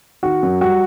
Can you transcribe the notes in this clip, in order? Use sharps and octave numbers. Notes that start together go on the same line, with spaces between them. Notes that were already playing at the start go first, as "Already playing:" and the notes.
D#3 F#4
F#2
G3 F#4